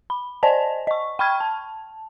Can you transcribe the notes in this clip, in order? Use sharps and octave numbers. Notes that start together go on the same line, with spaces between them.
B5
C5 D5 D#5 G#5 A5
D#5 C#6
G5 B5 C#6 F6 G#6
A5